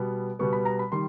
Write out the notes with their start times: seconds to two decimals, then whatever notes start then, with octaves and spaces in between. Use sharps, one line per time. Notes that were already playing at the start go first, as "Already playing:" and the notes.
Already playing: B2 G3 B3
0.39 B2 G3 B3 C#6
0.53 B5
0.65 A#5
0.79 B5
0.92 D#3 G3 C6